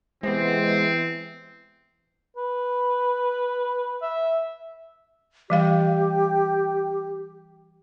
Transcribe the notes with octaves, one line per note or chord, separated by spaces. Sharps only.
C3 E3 G#3 B3 C4
B4
E5
E3 G3 G4 F5